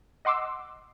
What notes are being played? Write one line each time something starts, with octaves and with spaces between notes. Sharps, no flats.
D#5 F#5 C6 D6 E6